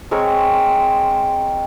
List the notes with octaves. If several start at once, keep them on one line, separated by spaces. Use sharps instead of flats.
G#3 C4 A#4 C#5